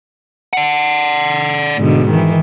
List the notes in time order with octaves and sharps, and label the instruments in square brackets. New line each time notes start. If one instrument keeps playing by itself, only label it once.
[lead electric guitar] D5 F#5
[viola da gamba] G#2 B2 D3
D#3 E3